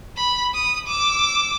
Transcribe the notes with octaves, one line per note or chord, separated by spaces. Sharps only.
B5
D#6
D6 E6